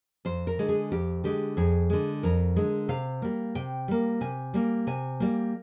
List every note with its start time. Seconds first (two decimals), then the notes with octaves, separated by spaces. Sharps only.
0.25 F2 C5
0.47 A#4
0.59 D3 G#3
0.69 G#4
0.92 F2 G4
1.24 D3 G#3 G4
1.57 F2 G#4
1.90 D3 G#3
2.23 F2 A#4
2.56 D3 G#3
2.89 C3 F5
3.22 G3 A#3
3.55 C3 G5
3.88 G3 A#3
4.21 C3 G#5
4.54 G3 A#3
4.87 C3 G#5
5.20 G3 A#3